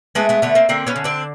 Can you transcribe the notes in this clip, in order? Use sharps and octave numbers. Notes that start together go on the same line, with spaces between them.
G#3 A3 B3
A3 B3
D3 A3 B3
A#3 C4
D3 A#3 C4
B3 C#4
D3
C4 D4